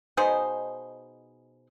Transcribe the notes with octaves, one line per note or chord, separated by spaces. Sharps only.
B2 D#4 G#4 C5